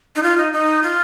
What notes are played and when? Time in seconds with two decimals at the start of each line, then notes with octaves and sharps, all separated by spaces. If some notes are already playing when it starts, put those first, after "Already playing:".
0.16 D#4
0.23 F4
0.38 D#4
0.53 D#4
0.83 F4